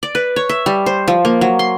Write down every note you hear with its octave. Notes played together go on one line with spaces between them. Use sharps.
D5
B4
C#5
E5
G3
C5
F3
A#3
F#3
C6